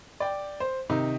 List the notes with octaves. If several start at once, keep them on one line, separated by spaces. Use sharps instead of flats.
D5 G5
C5
C3 D#3 D#4